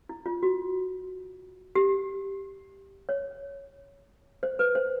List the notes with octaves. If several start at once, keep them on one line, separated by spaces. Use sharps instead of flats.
E4
F4
F#4
G4
C#5
C5
B4
C5